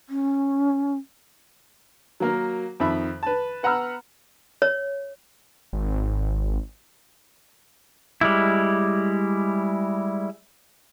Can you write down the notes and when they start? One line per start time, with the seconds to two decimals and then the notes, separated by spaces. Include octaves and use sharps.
0.09 C#4
2.20 F#3 A#3 A#4
2.80 F2 D#3 E5 B5
3.23 B4 A5
3.63 B3 F#5 A#5 B5 E6 F6
4.62 C#5
5.73 G#1
8.21 G3 G#3 E4